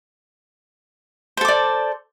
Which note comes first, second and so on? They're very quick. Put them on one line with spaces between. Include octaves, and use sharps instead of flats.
C5 A4 D6 D5